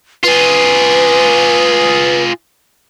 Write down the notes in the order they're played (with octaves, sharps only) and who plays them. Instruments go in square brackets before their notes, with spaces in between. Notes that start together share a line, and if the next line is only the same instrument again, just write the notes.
[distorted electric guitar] F4 G#4 [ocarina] B4